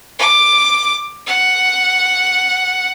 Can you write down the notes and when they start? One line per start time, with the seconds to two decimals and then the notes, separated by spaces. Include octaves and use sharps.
0.19 D6
1.27 F#5